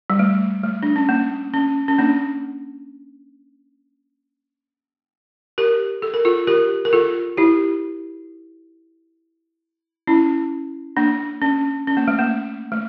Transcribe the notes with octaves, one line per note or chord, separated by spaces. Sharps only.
G3
A3
A3
D4
C#4
A#3
C#4
C#4
A#3 D4
G4 A#4
A4
A#4
F4 A4
G4 A#4
A#4
F4 A4
E4 G4
C#4 E4
A#3 D4
C#4
C#4
A#3
A3
A#3
A3